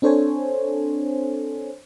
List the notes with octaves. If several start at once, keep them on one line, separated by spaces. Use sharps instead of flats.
C4 D4 A4 C5 C#5 G#5